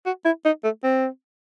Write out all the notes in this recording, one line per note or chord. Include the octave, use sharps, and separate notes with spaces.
F#4
E4
D#4
A3
C4